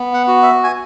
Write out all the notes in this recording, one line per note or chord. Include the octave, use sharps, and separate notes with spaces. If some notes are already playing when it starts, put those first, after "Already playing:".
Already playing: B3
F#5
F#4
E5
G#5